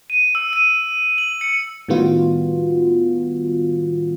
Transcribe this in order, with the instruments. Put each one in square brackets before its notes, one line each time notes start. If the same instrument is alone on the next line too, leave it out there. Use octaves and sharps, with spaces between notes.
[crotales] D#7
E6
D#7
F#7
C#7
[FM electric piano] A2 D#3 G3 B3 F4 F#4